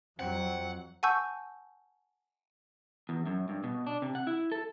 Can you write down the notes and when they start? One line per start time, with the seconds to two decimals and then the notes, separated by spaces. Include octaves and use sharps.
0.19 F2 F#3 C4 F#5
1.03 F#5 G#5 A5 C#6 E6 G6
3.09 E2
3.26 F#2
3.49 G2
3.64 B2
3.86 D4
4.02 C3
4.15 F#5
4.27 E4
4.52 A4